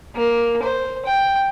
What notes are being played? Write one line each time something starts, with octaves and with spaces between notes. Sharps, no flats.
A#3
C5
G5